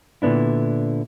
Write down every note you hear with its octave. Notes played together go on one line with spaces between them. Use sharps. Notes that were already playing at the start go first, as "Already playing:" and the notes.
A#2 D3 B3 D4 E4